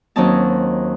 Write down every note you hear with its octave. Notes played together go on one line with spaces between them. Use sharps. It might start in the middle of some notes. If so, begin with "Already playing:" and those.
D#2 F#3 C4 C#4 D#4 A5